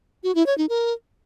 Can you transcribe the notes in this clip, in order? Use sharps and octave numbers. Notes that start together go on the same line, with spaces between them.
F#4
E4
C#5
D#4
A#4